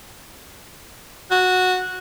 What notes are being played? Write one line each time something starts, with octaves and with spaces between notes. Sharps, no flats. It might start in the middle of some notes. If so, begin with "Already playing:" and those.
F#4